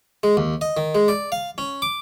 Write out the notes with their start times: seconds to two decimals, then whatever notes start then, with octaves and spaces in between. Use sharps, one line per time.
0.23 G#3
0.37 D#2
0.61 D#5
0.77 D#3
0.95 G#3
1.08 D5
1.32 F5
1.58 C#4
1.82 D6